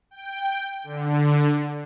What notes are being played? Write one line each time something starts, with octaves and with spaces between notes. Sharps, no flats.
G5
D3